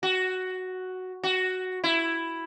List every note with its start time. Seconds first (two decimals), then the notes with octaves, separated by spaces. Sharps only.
0.03 F#4
1.23 F#4
1.84 E4